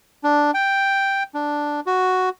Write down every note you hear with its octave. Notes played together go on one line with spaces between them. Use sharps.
D4
G5
D4
F#4